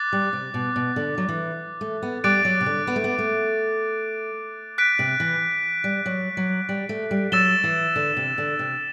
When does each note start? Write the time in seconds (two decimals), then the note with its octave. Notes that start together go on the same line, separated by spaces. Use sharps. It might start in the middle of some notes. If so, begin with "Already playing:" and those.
Already playing: D6 F#6 A6
0.13 G3
0.33 C3
0.54 B2
0.76 B2
0.96 D3
1.18 F#3
1.29 E3
1.81 A3
2.02 B3
2.24 G3 D6 F#6 A6 D7
2.45 F#3
2.61 C3
2.66 D3
2.87 B3
2.96 A3
3.04 B3
3.19 A3
4.78 F#6 B6 D7
4.99 C3
5.20 E3
5.84 G3
6.06 F#3
6.37 F#3
6.69 G3
6.89 A3
7.11 G3
7.32 F#3 E6 A6 E7 G7
7.64 E3
7.96 D3
8.17 C3
8.38 D3
8.59 C3